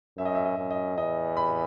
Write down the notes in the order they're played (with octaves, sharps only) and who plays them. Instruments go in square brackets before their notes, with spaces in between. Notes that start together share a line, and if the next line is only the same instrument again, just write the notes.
[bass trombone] F#2 [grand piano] E5
[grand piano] D#5
E5
D#5
[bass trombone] F#2
[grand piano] D#5
[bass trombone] E2 [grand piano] D#5
[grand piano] B5